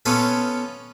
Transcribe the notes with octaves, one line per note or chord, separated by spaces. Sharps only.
B3 C#4 F4 A4 B4